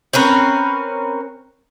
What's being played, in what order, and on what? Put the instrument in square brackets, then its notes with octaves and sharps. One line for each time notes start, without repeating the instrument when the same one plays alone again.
[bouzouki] C4 C#4 A#4 B4